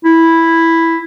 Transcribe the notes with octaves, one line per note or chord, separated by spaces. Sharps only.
E4